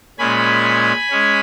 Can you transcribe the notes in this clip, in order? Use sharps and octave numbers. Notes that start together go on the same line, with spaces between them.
A#2 G#3 C#4 G#5 B5
G#3 C#4